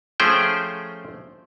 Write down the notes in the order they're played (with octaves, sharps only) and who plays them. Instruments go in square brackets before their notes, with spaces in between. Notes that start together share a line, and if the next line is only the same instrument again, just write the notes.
[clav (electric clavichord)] F3 A3 C#4 G#4 C5 G5